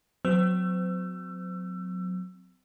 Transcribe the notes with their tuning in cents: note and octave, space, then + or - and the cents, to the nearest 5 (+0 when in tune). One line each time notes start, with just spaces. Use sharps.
F#3 -20 C4 -35 E6 +25